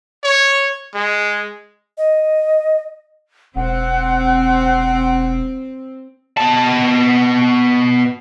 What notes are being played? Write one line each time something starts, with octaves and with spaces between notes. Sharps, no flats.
C#5
G#3
D#5
E1 C4 F#5
B2 A5